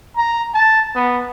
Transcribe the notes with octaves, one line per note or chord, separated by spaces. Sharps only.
A#5
A5
B3